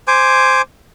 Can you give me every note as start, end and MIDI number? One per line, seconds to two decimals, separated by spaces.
0.08 0.62 72
0.08 0.62 80
0.08 0.62 86